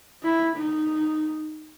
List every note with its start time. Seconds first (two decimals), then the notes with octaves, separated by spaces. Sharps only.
0.23 E4
0.57 D#4